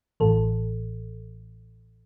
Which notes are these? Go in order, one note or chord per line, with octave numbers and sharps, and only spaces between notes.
A1 A2 E3 A4